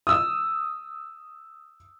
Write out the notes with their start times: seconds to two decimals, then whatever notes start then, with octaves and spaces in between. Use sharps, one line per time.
0.07 D#6 E6